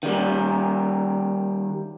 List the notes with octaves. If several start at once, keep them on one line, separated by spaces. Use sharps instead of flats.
D#3 G3